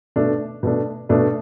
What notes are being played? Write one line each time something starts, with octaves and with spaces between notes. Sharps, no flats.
B2 A3 D4
B2 A3 D4
B2 A3 D4